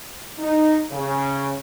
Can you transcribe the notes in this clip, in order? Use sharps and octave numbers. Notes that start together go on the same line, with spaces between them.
D#4
C#3